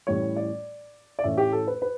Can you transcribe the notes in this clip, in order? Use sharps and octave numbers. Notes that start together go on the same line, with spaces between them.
A2 E3 G3 C#4 C#5
D5
D5
A2 E3 A3 C#4 E5
G4
A4
B4
B4